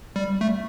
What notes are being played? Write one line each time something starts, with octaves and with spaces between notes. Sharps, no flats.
G3
A3